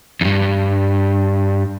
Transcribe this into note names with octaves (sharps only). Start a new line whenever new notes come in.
E2 G2